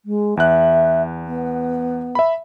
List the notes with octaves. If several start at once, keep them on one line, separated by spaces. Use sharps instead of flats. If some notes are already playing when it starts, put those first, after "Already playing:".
G#3
E2 E5 F#6
B3
E5 B5